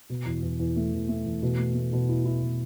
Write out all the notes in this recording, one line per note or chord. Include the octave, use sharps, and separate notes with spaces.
B2
E2
E2
E2
A3
E2
A3
E2
B2
A3
A3
B2
E4
E4
B2